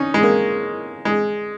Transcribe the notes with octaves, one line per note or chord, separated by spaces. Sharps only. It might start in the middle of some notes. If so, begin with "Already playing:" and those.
Already playing: C#4 D#4
G#3
A#3
G#3